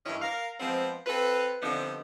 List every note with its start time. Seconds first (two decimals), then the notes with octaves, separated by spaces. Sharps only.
0.06 G2 D#3 E3 C#4 E4
0.22 A#4 F5
0.60 F3 G#3 B3 C4
1.06 C4 F4 A4 B4
1.62 D3 F3 G3 B3 C4 D#4